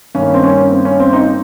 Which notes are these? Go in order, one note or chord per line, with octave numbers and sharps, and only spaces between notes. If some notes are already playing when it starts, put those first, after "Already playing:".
G2 D#3 A#3 C#4
C4
C#4
C4
C#4
C4
C4 D#4